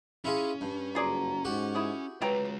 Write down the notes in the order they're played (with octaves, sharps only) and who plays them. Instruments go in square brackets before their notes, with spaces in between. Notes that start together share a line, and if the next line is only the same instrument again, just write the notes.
[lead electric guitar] C#4 [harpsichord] E4 F4 G#4
[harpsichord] G2
[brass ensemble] F#1 F#4 A#5 [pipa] F4 G#4 D5
[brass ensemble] G#2 [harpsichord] F#4 G4
[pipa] E4 G#4
[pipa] F#3 G5 A#5 [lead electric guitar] G#3 F4 [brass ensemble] B4